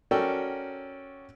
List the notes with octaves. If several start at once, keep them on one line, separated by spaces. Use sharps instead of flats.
C#4 F#4 A4 A#4 D5 G5